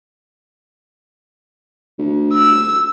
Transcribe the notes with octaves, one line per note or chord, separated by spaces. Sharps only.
D2
E6